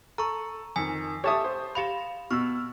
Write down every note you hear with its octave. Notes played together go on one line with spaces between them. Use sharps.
A4 A#5 C#6
F2 D#3 G#5
G4 A4 C#5 E5 A5 D#6
C5
G4 F5 B5 E7 F7
B2 C#6 E6 F6